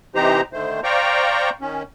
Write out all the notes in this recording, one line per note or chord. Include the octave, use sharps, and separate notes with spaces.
C3 E3 D#4 G4 C5 A#5
D3 D#3 A3 C5
C5 D5 F5 G5 A#5 C#6
D#3 C#4